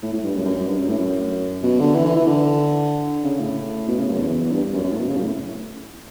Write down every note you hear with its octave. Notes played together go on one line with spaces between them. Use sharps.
A2
A2
G2
F#2
F#2
F#2
G2
F#2
A2
F#2
B2
D3
E3
E3
E3
D3
C#3
A2
B2
C#3
F#2
E2
G2
F#2
F#2
A2
B2
C#3
F#2
A2